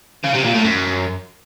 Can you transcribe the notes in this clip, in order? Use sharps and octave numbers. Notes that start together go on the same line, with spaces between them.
C#3
C3
A#2
A2
F#2